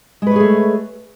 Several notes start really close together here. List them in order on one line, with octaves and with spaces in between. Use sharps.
G#3 B4 C#5 G#4 A3